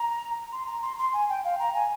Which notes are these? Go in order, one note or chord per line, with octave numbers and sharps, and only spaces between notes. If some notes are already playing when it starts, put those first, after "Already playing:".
Already playing: A#5
C6
A#5
C6
C6
G#5
G5
F5
A#5
G#5